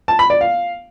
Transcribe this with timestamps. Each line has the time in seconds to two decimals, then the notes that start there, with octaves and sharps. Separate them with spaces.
0.08 A5
0.19 B5
0.30 D5
0.41 F5